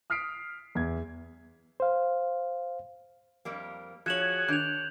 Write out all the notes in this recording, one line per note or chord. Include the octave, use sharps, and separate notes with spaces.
D#6 F6 B6 C7 D7
E2 G#6
C5 F5
F2 G3 A#3
F3 F#4 G#4 C#5 G#6 E7 F#7
D#3 D4 F#6 G6 F7